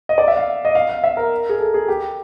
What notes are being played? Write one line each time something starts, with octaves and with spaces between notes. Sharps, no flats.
D#5
D5
E5
F5
D#5
F5
F5
E5
A#4
G#4
A4
G#4
G4